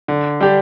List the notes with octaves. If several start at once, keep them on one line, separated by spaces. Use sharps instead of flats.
D3
G3 D4 G4